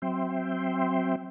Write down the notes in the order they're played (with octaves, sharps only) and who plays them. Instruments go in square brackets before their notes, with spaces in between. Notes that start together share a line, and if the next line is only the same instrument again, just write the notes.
[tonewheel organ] F#3 C4 E5 G5 C6